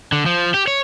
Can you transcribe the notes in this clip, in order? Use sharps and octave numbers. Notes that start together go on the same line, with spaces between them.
D3
F3
G4
C#5